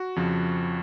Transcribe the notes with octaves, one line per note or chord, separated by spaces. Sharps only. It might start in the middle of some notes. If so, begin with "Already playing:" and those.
Already playing: F#4
F2 C#3 F3